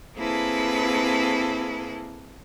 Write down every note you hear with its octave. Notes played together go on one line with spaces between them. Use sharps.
A#3 C4 E4 G#4 A4 B4